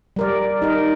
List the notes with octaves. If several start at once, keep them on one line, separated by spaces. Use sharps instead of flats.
G3 A#4 D5
D#4 A#4